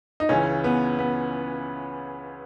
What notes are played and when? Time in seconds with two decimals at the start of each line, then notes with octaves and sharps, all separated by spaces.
0.20 D#4
0.29 C#2 C#3 E3 C#4
0.64 B3
0.99 B3